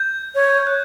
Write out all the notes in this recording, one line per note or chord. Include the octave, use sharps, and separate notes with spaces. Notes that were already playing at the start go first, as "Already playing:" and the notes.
Already playing: G6
C#5
F#6